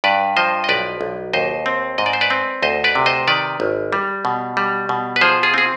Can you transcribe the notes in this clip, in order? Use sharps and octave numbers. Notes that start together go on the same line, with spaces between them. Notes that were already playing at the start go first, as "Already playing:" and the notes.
G2 B4 D5
F3 C5 D#5
D#5
B1 B4 D5
B1
D#2 C5 D#5
C4
G#2 D#5
D5
C5
B4 D5
C4
D2 C5 D#5
B4 D5
C3
C5 D#5
D#3 B4 D5
G#1
G3
B2
G3
B2
B4
F3 G#4 C5
F4 G#4
C4 G#4